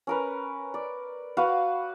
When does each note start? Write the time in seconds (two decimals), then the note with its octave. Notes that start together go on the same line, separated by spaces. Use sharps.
0.07 C#4 A#4 B4
0.74 D5
1.37 F#4 B4 F5 F#5